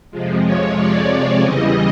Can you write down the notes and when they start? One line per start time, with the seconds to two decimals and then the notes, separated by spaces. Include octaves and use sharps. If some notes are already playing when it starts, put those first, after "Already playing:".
0.11 F2 C3 F3 G#3
0.43 C#5
0.76 D5
1.41 E2 C#3 E3 G3 D#5